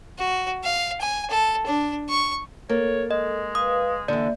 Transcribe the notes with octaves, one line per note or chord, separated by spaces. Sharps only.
F#4
F5
G#5
A4
D4
C#6
A#3 A4 C#5
G#3 D#5
B4 F5 D#6
D3 E3 A#3 D5 E5